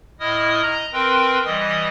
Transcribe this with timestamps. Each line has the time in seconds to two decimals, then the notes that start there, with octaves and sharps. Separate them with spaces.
0.20 A2 E4 D#5 D#6 F6
0.62 D#5 A#5
0.93 C4 A#4 B4 G5 C6
1.45 E3 G3 D#5 D#6